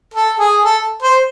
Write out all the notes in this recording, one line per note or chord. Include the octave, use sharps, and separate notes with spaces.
A4
G#4
A4
C5